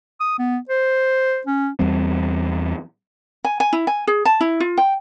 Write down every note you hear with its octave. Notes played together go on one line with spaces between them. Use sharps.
D#6
B3
C5
C#4
E2 G3 C4
G#5
G#5
E4
G#5
G#4
A5
E4
F4
G5